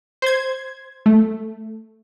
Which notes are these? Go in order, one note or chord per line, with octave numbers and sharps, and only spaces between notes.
C5 G#6
A3